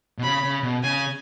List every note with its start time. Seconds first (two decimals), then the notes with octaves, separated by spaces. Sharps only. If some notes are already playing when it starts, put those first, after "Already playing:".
0.18 B2
0.23 C#3 B5
0.44 C#3
0.63 B2
0.83 C#3 G#5